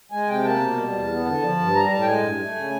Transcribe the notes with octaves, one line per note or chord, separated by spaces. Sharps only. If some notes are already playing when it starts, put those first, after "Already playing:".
G#3 G#5
C3 G5
A#3 A5
B2
G3
E2
B3
D3
F3
G2
G3 A#5
A2 A5
G5
G#3 G#5
G2
A3
C#3